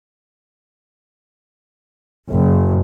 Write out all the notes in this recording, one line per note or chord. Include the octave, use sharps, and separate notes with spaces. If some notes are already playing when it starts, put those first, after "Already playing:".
F#1